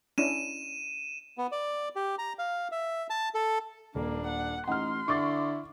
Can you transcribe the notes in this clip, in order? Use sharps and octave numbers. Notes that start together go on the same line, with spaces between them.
C#4 D4 E4 D#7 E7
B3
D5
G4
A#5
F5
E5
A5
A4
D#1 A#3 D4
F#5
A1 D#4 F#5 C6 F6
D3 E4 C#6 D6 A6